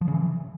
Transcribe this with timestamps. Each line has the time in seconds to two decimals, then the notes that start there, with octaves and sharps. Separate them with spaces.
0.01 F3
0.08 C#3
0.14 E3